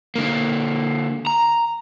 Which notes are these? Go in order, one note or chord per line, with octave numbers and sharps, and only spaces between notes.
D3 A#3
A#5